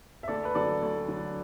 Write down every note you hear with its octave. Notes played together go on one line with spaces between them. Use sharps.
E5
D2 A4 D5
B4
D3 F#3 A4 D5
D2
D3 F#3